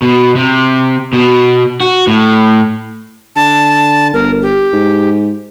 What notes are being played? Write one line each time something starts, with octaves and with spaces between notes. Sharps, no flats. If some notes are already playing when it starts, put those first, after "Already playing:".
B2
C3
B2
F#4
A2
D3 A5
G1 A#4
G4
G#2